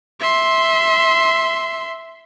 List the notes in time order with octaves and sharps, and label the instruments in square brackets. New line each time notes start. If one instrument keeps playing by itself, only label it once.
[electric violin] E5 C6